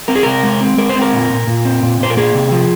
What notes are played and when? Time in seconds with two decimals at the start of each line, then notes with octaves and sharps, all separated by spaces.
0.08 C4 A#4
0.15 G#4
0.23 C3 A#4
0.43 G#3
0.61 C4
0.78 G#3 A#4
0.89 C5
0.95 C4
1.02 A#4
1.13 A#2
1.30 A#2
1.47 A#2
1.65 C4
1.83 A#2
2.00 A#2 C5
2.10 A#4
2.17 A#3 G#4
2.34 C3
2.52 F3